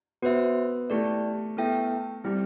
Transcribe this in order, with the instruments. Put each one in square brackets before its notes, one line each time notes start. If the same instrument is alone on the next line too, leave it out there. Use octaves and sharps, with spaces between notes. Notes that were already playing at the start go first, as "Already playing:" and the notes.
[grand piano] B3 [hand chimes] F#4 C5 E5
[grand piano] A3 [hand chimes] E4 G4 D5
[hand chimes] B3 E4 A4 E5 G5
[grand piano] G3 [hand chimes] C4 E4 G4